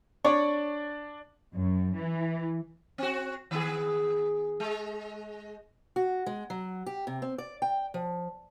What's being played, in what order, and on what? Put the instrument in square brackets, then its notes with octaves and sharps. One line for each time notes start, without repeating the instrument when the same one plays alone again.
[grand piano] D4 D5 [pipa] C#5
[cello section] F#2
E3
[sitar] C4 F#4
D#3 B3 G#4
G#3
[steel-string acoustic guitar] F#4
G#3
F#3
G4
C3
C4
D5
G5
F3